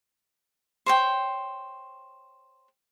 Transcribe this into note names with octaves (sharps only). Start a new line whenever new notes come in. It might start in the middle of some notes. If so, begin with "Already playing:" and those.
C5 C#5 G5